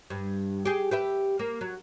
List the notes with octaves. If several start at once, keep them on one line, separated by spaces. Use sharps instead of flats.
G2
G4 G#4
G4 B4 E5
A#3
F#3